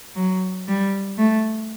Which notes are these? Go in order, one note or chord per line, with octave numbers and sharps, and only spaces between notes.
F#3
G3
A3